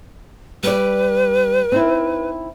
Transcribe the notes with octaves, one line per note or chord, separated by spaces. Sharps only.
G3 B4 D5
C4 D#4 E4